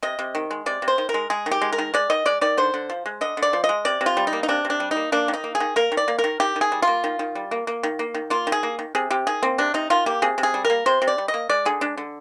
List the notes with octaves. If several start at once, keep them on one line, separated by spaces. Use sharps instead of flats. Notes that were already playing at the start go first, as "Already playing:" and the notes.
C3 D#5
C3
D#3
G#3
C3 D5
C3
C5
D#3
A#4
G#3
G#3 G#4
D#3
G4
G#3
A#4
D#3
G#3 D5
D#3 D#5
G#3 D5
D#3 D5
D3 C5
D3
F3
G#3
D3 D#5
D3
D5
F3
D#5
G#3
C3 D5
C3
F4
G3
D#4
A#3
D#4
C3 D4
C3
D4
G3
D#4
A#3
A#3 D4
D#3
D#4
A#3
G#4
D#3
A#3 A#4
D#3
D5
A#3
A#4
D#3
D#3 G4
D#3
G#4
G3
F4
A#3
D#3
D#3
G3
A#3
A#3
D#3
A#3
D#3
A#3 F4
D#3
G#4
A#3
D#3
C3 G#4
C3 G4
D#3 G#4
A#3 C4
C3 D4
C3 D#4
D#3 F4
A#3 G4
C3 G#4
C3
G#4
G3
A#4
A#3
C3 C5
C3
D5
G3
D#5
A#3
G#3 D5
D3 G#4
G#3 D4
D3